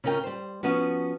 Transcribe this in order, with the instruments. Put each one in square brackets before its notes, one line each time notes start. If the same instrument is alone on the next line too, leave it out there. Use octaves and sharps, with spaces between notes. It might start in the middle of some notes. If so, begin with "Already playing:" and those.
[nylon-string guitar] C#3 C#4 F4 A#4 G5
G3 C5
F3 B3 C#4 F#4